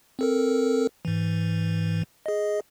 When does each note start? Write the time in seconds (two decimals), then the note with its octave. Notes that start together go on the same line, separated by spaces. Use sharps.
0.19 C4 A4 A#4
1.05 G#2 E3
2.26 G#4 D#5